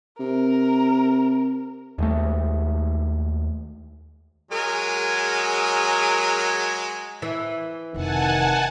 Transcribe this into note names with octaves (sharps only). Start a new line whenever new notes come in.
C3 A#4
D#2 G#3 A3
F#3 G#3 G#4 A#4 G#5
E3
F1 C3 D#3 F#5 G#5 A5